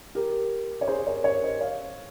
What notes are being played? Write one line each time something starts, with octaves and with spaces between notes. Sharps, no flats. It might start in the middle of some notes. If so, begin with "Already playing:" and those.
G4 A#4
C#5
G#4 C5
A#4 C#5
A#4 C#5
C5 D#5
C#5 F5